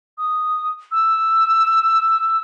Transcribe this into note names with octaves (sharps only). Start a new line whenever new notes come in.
D#6
E6